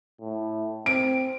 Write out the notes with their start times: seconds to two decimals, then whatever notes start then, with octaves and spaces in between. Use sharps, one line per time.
0.21 A2
0.86 C4 D7